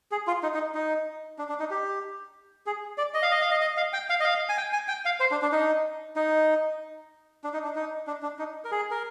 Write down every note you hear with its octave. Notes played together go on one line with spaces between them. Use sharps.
G#4
F4
D#4
D#4
D#4
D4
D4
D#4
G4
G#4
D5
D#5
F5
D#5
F5
D#5
D#5
F5
G5
F5
D#5
F5
G#5
G5
G#5
G5
F5
C5
D4
D4
D#4
D#4
D4
D#4
D4
D#4
D4
D4
D#4
A#4
G#4
A#4